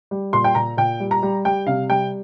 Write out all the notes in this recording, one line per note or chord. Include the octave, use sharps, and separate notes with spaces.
G3
A#2 C6
G5
A#2 A#5
A#2 G5
G3
A#5
G3
G3 G5
C3 F5
G3 G5